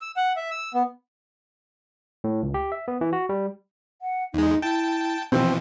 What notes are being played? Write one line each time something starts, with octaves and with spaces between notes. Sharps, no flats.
E6
F#5
E5
E6
B3
A2
C#2
G4
E5
B3
E3
F#4
G3
F#5
E2 G#3 D#4
E4 G5 A5
B2 E3 F3 C4 G5